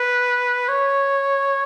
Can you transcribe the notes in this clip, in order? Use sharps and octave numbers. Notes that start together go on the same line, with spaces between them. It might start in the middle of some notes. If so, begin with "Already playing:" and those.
Already playing: B4
C#5